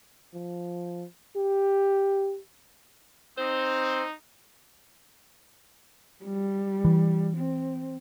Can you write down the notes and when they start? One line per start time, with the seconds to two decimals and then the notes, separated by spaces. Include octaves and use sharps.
0.34 F3
1.36 G4
3.38 C4 D#4 C5
6.25 G3
6.85 E3
7.37 C4